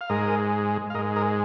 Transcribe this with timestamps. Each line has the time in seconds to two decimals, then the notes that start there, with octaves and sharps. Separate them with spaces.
0.01 F5
0.10 G#2 G#3 A#4 D#5
0.90 F5
0.94 G#2 A#4 D#5
0.99 G#3
1.16 A#4 D#5